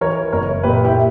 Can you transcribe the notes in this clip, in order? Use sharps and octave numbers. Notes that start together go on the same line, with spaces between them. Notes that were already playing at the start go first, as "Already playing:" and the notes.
E3 A#4 C#5
F#1 A#4 C#5
A#2 G4 B4
E4 G4